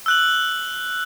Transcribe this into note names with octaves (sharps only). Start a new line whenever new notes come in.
E6 F#6 F#7